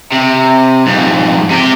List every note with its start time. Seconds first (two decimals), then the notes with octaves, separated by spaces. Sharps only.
0.12 C3
0.87 F2 G#2
1.51 C3 G4